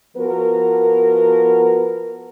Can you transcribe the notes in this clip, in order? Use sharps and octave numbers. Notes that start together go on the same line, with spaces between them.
F3 B3 F#4 A#4